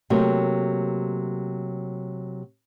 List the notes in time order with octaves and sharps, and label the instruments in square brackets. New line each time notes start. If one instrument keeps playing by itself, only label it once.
[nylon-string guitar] C3 F#3 A3 A#3 C4